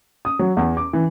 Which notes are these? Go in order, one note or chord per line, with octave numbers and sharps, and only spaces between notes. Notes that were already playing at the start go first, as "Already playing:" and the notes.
D#6
F#3
E2
D6
E3